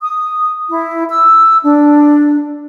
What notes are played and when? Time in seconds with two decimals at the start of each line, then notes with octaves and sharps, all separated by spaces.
0.02 D#6
0.69 E4
1.10 E6
1.64 D4